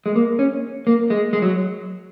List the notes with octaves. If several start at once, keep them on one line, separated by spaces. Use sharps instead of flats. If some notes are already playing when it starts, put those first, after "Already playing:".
G#3
A#3
C#4
A#3
G#3
G#3
F#3